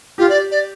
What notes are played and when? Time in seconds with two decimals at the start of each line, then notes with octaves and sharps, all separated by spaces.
0.18 F4 G4
0.29 D5
0.51 D5